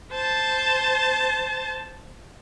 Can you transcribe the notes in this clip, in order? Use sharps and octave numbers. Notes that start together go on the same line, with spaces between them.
C5 A5